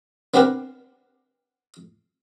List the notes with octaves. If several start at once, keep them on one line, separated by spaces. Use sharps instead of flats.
B3 C4 D4 G4 A#4 B4